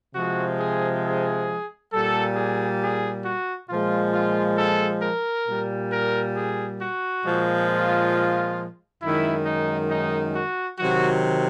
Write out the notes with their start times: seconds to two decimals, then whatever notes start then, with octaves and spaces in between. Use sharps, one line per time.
0.15 C3 F3 G#3 F#4
0.59 G#4
1.04 G#4
1.93 A#2 G3 A4
2.36 G#4
2.82 G#4
3.25 F#4
3.69 A#2 F3 G#3 F4
4.14 F4
4.58 A4
5.03 A#4
5.48 A#2 G3
5.92 A#4
6.36 G#4
6.81 F#4
7.25 A#2 F3 G#3
7.70 F4
9.03 F#2 D#3 G#3 E4
9.46 D#4
9.91 D#4
10.36 F#4
10.79 C3 D#3 F#3 F#4